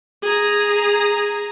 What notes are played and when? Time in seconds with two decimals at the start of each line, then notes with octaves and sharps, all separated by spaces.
0.22 G#4 A#5